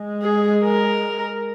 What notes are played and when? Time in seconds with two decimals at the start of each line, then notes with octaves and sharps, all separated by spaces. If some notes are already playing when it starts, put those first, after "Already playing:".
Already playing: G#3
0.22 G#4
0.64 A#4